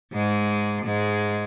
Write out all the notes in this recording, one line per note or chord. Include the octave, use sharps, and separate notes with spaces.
G#2 G#3
G#2 G#3